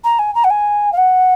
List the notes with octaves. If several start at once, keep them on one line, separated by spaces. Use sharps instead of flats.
A#5
G#5
A#5
F#5
G#5
F5
F#5